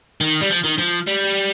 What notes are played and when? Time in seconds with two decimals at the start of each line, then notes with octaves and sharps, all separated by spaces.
0.21 D#3
0.41 G3
0.49 F3
0.64 D#3
0.78 F3
1.07 G3